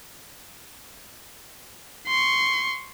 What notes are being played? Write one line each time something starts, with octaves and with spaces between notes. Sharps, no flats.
C6 C#6